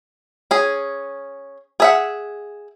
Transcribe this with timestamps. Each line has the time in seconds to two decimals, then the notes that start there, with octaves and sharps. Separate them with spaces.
0.51 C#4 G#4
1.80 G#4 E5 F#5